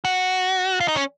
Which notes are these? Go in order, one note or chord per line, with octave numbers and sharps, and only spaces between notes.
F#4
F4
D#4
C#4